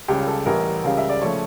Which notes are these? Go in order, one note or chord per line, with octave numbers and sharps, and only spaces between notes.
C#2 C#3 G3 G4
A4
A1 A2 E3 G3 A#4
C#2 C#3 G3 F5
E5
D5
C#3 F3 A3 C#5